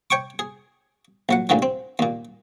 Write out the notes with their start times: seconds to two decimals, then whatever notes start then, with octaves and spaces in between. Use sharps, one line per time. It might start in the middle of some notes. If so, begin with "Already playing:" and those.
0.10 C#5 G5 C#6 D6
0.39 G#4
1.29 A#1 F#3 F#5
1.49 A1 D2 A#2 D3 E3 G3
1.62 C4
1.99 D#2 A#2